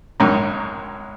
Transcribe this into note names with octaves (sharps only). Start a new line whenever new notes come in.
A#1 G#2 D#3 F#3 D#4